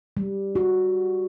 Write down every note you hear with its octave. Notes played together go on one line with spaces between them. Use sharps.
G3
F#4